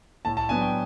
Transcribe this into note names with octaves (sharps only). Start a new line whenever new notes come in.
A2 A5
A5
F#3 B3 D4 G#5
G5